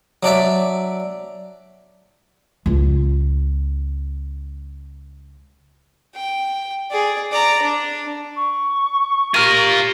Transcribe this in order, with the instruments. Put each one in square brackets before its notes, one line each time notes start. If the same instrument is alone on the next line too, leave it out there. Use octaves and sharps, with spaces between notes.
[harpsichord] F#3 D4 D5 E5
[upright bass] C#2 F4
[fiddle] G5
G#4 D5
D5 A#5
D4
[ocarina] C#6
[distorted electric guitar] F4 A#4 [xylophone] G4 F6 D#7